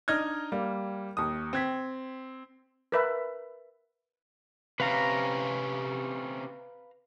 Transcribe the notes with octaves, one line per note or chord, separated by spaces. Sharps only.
D4 D#4 D#5 F6 G#6
G3 A#3
D#2 D#6
C4 G#6 B6
A#4 B4 E5
C3 C#4 B4 F5 A#5